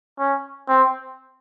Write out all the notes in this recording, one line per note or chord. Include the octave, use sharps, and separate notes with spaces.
C#4
C4